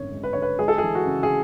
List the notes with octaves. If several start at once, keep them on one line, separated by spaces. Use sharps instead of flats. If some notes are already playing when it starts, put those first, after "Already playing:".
Already playing: G#1 F#2 D3 C#5
G#3
B4
D3 C#5
B4
G#3 G#4
A4
E3 G#4
F#4
C#3
G#4